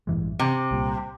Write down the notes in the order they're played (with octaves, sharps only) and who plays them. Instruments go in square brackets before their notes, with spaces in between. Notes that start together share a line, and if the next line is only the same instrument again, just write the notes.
[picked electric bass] A1 G2 E3 G#3
[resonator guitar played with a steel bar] C3
[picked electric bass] C2 A#2 G3